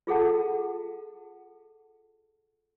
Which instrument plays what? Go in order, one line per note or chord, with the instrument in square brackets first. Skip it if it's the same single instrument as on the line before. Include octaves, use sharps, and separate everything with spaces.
[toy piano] F4 G#4 A4 F#5 A5